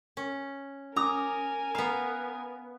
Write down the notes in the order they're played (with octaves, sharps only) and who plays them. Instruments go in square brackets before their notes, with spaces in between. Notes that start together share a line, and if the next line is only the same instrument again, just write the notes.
[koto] C#4
[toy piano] C#4 D6 D#6 [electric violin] A#4 G#5 [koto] A#5
[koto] B3 F5 [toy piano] A#5